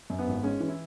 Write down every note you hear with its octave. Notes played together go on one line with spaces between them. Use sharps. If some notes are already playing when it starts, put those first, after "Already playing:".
F#2
B3
G#1
G#3 C#4
E3
E4